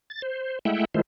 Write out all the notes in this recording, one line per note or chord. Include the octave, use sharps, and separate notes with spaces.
A6
C5
G#3 A3 E4 E5 F#5 G5
D#3 G#3 A3 E4 F4 C5